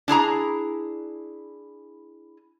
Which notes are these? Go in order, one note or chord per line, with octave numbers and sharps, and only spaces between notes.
D4 E4 G#4 A#5